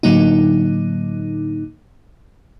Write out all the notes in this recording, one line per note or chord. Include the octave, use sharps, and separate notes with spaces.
A2 D3 F#3 A#3 D#4